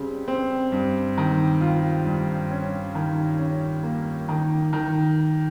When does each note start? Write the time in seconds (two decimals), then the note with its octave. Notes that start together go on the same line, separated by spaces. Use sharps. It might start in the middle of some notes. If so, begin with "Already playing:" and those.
Already playing: C#3 G3 C4
0.28 C4
0.72 G2
1.18 D#3
1.61 F4
2.05 G2
2.51 C#4
2.95 D#3
3.39 C#4
3.83 A#3
4.28 D#3
4.73 D#3